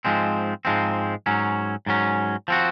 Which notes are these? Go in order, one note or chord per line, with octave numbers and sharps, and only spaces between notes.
G#2 F3 G#3 C4
G#2 F3 G#3 C4
G#2 F#3 C#4
G#2 F#3 C#4
F3 C4 F#4